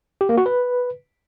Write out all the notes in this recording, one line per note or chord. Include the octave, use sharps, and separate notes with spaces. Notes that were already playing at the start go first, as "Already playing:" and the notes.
G4
A#3
F#4
B4